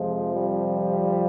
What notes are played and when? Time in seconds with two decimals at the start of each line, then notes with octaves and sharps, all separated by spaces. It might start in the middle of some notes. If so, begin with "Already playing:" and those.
Already playing: F2 C3 F3 G#3
0.31 G3